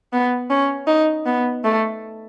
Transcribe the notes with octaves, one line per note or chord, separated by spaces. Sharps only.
B3
C#4
D#4
B3
A3